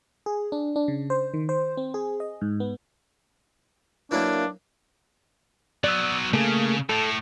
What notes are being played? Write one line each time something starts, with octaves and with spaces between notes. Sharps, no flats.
G#4
D4
D4
C#3
C5
D#3
C5
C4
G#4
D#5
G#2
B3
E3 F#3 A#3 D4
F#3 B3 D5 E6
C#3 A3 A#3 G#4
A2 A4